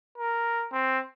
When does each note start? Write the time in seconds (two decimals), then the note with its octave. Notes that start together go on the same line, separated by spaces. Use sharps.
0.18 A#4
0.73 C4